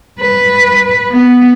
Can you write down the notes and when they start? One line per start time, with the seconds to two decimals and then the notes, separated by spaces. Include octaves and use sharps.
0.20 B4
1.11 B3